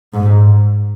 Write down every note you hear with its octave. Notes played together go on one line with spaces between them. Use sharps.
G#2